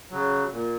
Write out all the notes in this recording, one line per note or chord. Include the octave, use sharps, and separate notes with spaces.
C#3 F#3
A#2